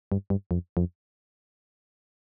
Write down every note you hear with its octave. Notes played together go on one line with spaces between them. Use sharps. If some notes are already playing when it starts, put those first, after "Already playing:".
G2
G2
F2
F2